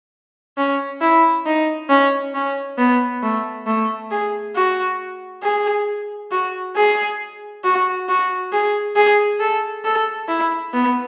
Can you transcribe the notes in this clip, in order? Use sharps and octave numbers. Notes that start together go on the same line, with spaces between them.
C#4
E4
D#4
C#4
C#4
B3
A3
A3
G#4
F#4
G#4
F#4
G#4
F#4
F#4
G#4
G#4
A4
A4
E4
B3